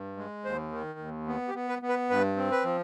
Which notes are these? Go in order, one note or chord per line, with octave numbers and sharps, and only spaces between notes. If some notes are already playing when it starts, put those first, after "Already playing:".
Already playing: G2
G#3
D#2 C5
D#3
D#2
B3
G4
B3
B4
B3
B4
G2 B4
C4
B4
F3